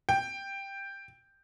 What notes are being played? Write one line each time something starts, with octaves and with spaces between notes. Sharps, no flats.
G5